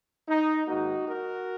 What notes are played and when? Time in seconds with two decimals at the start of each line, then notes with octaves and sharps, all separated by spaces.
0.28 D#4
0.67 G#2 D#3 A#3 D#4 F#4
1.07 F#4 A#4